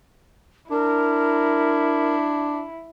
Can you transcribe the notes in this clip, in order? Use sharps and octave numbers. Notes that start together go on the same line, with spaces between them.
D4 E4 A#4